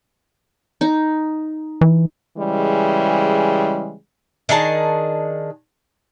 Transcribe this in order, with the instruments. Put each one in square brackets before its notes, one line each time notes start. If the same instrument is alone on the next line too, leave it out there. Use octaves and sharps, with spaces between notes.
[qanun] D#4
[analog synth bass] E3
[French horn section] C#3 E3 G3 G#3
[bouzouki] D#3 D4 G#4 A5